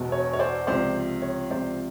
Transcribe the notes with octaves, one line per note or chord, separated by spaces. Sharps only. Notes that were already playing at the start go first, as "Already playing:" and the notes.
Already playing: E1 E2 B2
C#5
C#5
C5 D5
C#2 C3 F3 C5 D5
C#5
C#2 C3 F3 C5 D5